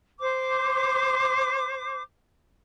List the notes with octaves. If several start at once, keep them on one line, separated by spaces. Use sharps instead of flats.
C5 D6